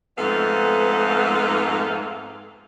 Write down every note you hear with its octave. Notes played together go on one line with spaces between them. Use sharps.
F2 G#2 A3 B3 A4 F5